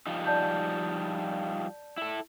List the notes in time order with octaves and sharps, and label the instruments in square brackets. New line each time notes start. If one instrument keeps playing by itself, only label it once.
[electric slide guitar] F3 G3 D#4
[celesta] D5 A5 G6
[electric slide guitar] E4 A4